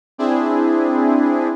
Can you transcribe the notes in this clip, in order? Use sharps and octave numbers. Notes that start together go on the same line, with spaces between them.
C4 D4 E4 G#4